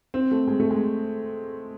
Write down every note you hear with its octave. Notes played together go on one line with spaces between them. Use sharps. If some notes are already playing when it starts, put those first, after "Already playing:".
C4
A3
G#3
A3
G#3